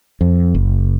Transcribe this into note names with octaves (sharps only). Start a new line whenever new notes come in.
F2
F#1